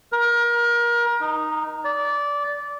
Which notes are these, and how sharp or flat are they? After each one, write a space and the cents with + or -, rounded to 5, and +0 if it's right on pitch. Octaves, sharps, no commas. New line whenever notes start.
A#4 +30
D#4 -10
D5 -20